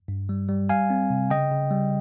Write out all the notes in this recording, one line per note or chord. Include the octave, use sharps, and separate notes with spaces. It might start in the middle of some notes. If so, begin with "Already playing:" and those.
G2
G3
G3
G3 F5 G#5
C4
C3
C#3 D#5 G5
C#3
G3